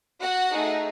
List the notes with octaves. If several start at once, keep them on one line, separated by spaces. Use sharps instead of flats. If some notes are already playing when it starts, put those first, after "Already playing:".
F#4 F#5
A3 D#4 G#4